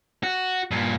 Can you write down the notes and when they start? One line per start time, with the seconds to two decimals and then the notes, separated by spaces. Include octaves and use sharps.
0.23 F#4
0.71 G2 A#2